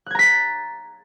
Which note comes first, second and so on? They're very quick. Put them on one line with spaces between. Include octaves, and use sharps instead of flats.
F#6 G#6 A#5 B6 A6